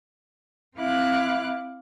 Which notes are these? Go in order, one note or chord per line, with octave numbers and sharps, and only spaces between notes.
C4 E4 F5 D6 F#6